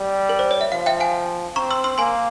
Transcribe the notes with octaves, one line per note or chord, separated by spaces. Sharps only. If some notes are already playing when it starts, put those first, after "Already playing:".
Already playing: G3
A#4
C5
C#5
E5
F3 F5
E5 G5
F5 G#5
C4 A#5 C#6
C6 E6
C6 E6
A#3 G#5 C6